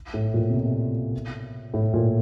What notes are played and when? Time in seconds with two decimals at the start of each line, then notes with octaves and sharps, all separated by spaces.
0.14 A2
0.34 A#2
0.49 C3
0.53 B2
1.74 A2
1.93 A#2